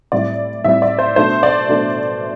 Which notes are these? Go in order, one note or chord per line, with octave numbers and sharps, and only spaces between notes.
A2 G3 C4 E4 D5
A2 G3 C4 E4 E5
D5
C5
B2 A3 D4 C5
D5
B2 A3 D4